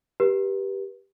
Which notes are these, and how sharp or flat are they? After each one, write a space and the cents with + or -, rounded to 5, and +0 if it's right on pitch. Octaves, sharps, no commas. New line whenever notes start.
G4 +0 B4 -35